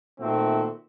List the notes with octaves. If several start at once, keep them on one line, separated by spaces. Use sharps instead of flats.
A#2 D#3 A3 C4 F#4 E5